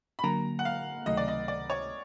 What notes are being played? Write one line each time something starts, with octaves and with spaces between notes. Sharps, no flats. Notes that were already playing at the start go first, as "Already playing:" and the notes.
B5
D3 F#3 A#3 A#5
F#5
F5
C#2 C3 D#3 F#3 A3 D#5
D5
D#5
D5
C#5